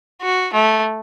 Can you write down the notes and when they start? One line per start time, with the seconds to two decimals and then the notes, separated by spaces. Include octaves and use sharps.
0.22 F#4
0.53 A3